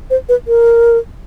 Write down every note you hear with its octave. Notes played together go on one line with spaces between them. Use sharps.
C5
B4
A#4